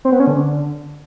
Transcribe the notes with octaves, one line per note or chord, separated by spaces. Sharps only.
C4
B3
C#4
D3